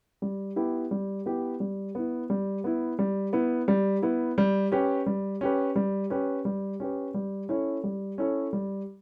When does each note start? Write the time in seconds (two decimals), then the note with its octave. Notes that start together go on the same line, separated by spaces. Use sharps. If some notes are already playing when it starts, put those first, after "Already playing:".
0.22 G3
0.56 B3 E4 G4
0.91 G3
1.26 B3 E4 G4
1.60 G3
1.95 B3 E4
2.30 G3
2.64 B3 E4
2.99 G3
3.33 B3 E4
3.68 G3
4.02 B3 E4
4.38 G3
4.72 C#4 G4 B4
5.06 G3
5.41 C#4 G4 B4
5.76 G3
6.10 C#4 G4 B4
6.45 G3
6.80 C#4 G4 B4
7.14 G3
7.49 C#4 E4 A4 C#5
7.84 G3
8.18 C#4 E4 A4 C#5
8.53 G3